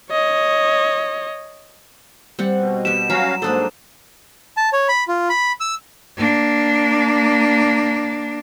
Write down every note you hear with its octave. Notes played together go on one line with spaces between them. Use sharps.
C#5 D#5
G3 C4 F#5
B2
B3 G4 E7
F#3 C#4 F#4 F5 A#5 B5
G#2 A#3 D4 A4 C5 D#6 F#6
A5
C#5
B5
F4
B5
E6
A#3 D4